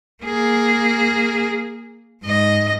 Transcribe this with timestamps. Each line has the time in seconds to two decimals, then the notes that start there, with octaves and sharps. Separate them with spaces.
0.24 A#3 G#4
2.23 G#2 D#5